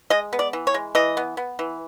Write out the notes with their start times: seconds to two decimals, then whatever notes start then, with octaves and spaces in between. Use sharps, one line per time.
0.10 G#3 D#5
0.33 B3
0.39 D5
0.53 E3
0.67 C#5
0.74 G#3
0.95 E3 D#5
1.17 B3
1.37 B3
1.59 E3